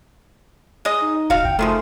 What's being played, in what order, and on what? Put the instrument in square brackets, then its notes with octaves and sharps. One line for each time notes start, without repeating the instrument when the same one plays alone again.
[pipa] G#3 D#5
[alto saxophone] D#4
[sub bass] D1 [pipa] F#4 F5
[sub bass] F#1 [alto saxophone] G5
[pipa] D#3 F3 G#3 [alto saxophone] A3